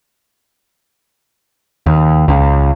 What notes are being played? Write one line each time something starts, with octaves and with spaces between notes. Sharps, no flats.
D#2
C#2